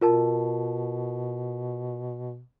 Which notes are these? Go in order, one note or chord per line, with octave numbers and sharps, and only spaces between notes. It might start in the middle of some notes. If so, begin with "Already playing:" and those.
B2 F4 A#4 A5